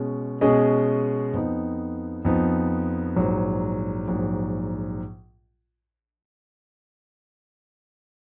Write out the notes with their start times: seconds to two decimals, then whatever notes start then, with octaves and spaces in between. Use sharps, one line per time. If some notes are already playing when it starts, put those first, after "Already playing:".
Already playing: B2 G#3 C#4 G#4
0.41 B2 G#3 C#4 G#4 D#5
1.33 F2 F3 B3 D#4
2.25 F2 F3 B3 D#4
3.16 A#1 G#2 F#3
4.08 A#1 G#2 F#3